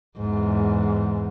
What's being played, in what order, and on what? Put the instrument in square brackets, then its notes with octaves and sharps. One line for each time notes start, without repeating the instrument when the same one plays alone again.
[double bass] E2 G#2